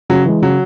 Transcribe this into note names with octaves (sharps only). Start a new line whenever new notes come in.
C#3 F#3
E3 G#3
C#3 F#3